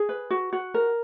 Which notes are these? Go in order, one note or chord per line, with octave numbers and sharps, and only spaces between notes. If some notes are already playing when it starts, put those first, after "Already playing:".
Already playing: G#4
B4
F#4
F#4
A#4